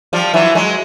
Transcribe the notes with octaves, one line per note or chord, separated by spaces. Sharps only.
F3 G3
E3 F#3
F#3 G#3